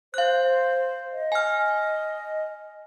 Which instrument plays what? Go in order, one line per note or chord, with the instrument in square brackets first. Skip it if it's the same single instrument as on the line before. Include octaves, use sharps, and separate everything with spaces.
[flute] C5 [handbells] F5 F#6
[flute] D#5
[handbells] G#5 F6